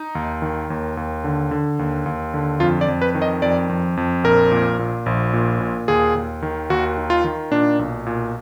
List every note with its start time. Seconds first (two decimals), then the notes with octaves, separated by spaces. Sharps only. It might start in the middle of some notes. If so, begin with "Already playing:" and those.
Already playing: D#4
0.15 D#2
0.42 D#3
0.70 D#2
0.97 D#2
1.24 D3
1.51 D3
1.79 D#2
2.06 D#2
2.34 D3
2.60 F2 F4
2.81 D5
2.88 F2
3.02 B4
3.15 D#3
3.22 D#5
3.42 F2 D5
3.69 F2
3.97 F2
4.24 A#1 A#4
4.52 A#2
4.79 A#2
5.06 A#1
5.33 A#2
5.61 A#2
5.88 D#2 G#4
6.15 D#2
6.42 D#3
6.70 D#2 F#4
6.97 D#3
7.10 F4
7.24 D#3
7.51 A#2 D4
7.79 B1
8.06 A#2